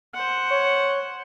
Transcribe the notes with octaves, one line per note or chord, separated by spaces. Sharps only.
C5 F#5
C#5